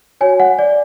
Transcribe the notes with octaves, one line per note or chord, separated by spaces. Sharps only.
F#4 C#5 G#5
F#5
D5